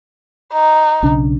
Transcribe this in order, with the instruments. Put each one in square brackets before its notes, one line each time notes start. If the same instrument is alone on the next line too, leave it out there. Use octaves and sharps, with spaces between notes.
[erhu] D#4
[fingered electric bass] B1 C#3 D4